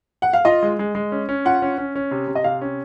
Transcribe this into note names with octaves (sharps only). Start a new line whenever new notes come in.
F#5
F5
F4 D#5
G#3
G#3
G#3
C#4
C#4
F4 F#5
C#4
C#4
C#4
C3
C3
D#5
C3 F5
C#4